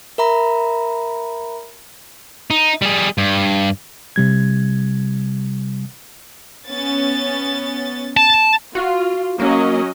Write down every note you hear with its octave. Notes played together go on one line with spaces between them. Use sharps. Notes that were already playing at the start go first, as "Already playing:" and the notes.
A#4 E5 A#5 B5
D#4
G3 G#4
G2
C3 G3 G#6
B3 C#4 A6
A5
F4 F#4
F#3 A#3 C#4 D#5